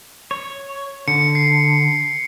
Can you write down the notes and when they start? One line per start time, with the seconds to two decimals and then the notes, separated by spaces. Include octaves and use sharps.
0.31 C#5
1.08 D3 C#7
1.35 C7